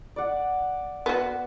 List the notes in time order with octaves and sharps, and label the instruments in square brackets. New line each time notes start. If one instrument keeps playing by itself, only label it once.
[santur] D5 F#5
[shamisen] B3 F#4